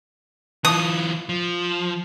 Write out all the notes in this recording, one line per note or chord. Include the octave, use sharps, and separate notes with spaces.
E3 F4 D#6
F3